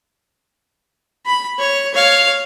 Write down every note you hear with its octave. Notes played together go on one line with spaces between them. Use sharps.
B5
C#5
C#5 F5